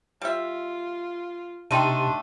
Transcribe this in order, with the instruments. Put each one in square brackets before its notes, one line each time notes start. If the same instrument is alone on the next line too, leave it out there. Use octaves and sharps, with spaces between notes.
[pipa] G3 E5 [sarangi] F4
[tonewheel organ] C3 [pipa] A3 D#4 [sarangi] D4 [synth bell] G5 C6 D#7